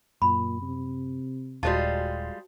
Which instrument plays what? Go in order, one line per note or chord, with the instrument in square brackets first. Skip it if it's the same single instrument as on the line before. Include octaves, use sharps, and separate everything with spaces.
[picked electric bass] F#2 [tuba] A#2 [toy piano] B5
[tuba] C3
[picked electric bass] D#1 [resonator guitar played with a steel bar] G3 G#3 F4 [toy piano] F#4 C5 A5